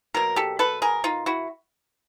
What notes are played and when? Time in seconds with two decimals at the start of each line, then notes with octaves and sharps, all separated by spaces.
0.14 B2 F#3 A#3 A#4
0.36 G4 A4
0.59 A4 B4
0.82 G#4 A#4
1.04 D#4 F4
1.26 E4 F#4